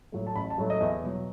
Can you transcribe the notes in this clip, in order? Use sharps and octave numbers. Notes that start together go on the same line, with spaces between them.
A2 F#3 A3
A5
A1 B5
A5
A2 F#3 A3
D#5
E2 E5
B2 F#3